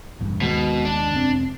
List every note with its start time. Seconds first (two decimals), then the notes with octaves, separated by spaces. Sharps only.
0.20 E1 A1 G2
0.41 D#2 B2 D#3 G#3
0.85 D4
1.14 E1 C4